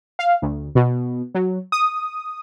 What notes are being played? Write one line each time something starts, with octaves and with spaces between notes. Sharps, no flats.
F5
D2
B2
F#3
D#6